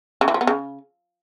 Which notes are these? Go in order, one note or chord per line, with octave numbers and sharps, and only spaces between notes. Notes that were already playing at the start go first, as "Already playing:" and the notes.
C#3
E3
F3
B3
C#3